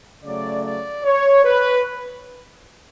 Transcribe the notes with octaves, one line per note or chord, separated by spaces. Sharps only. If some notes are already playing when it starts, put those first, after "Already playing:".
C#3 F#3 A3 D5
D5
C#5
B4